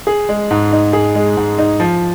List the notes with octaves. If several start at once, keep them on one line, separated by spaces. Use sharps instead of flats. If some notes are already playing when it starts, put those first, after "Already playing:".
G#4
G#3
G#2
D#4
G#4
G#3
G#2
D#4
F3